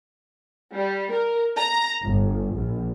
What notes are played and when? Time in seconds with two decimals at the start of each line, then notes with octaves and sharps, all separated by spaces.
0.74 G3
1.13 A#4
1.57 A#5
2.03 G1
2.54 A#1